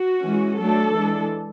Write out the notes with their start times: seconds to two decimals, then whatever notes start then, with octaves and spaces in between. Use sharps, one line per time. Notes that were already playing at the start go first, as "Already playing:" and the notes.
Already playing: F#4
0.22 E3 G#3 C#4
0.58 F#3 A3 D4 A4
0.94 E3 G#3 D4